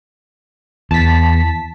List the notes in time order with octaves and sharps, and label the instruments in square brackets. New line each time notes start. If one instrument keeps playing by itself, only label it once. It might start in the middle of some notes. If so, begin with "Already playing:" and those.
[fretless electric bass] E2 [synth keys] A5 B6